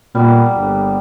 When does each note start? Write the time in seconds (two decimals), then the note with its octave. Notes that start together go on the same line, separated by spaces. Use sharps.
0.15 A#2 G3 A#3 B3
0.57 G1